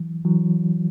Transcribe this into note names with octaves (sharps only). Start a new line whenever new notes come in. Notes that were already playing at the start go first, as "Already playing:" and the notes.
Already playing: E3 F#3
E3 F#3